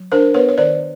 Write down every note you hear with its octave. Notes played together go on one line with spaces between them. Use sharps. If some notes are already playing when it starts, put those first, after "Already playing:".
Already playing: F#3
D4 A#4 C5
B3 B4 C#5
C#5
D#3 C5 D5